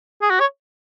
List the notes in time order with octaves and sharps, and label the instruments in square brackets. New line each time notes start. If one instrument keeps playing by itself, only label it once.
[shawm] G#4
F#4
C#5